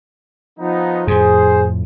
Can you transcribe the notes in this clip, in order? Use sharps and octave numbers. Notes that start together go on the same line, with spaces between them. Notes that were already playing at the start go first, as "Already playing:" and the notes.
F3 B3 D#4
F2 A2 G#4 C5